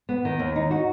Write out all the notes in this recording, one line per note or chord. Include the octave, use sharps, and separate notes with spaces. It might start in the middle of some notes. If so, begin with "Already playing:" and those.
B3
D#3
D#2
D#4
F#4